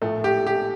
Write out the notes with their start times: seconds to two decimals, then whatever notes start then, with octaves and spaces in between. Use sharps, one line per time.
0.02 A#1 A2 A3
0.24 G4
0.47 G4